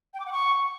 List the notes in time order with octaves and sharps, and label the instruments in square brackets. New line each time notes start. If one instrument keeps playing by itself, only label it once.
[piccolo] G5
D6
F#5
C#6